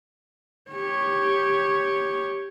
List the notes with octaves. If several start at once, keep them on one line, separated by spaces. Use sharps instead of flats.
G4 C#5